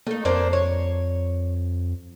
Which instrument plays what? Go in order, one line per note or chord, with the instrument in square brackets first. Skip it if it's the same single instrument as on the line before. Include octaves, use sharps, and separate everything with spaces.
[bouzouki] A3 D#4 [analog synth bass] A#3
[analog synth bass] F2 [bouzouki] A#3 D4 C5
[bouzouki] C#5